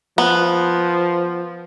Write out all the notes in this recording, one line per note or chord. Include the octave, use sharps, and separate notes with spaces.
F3 B3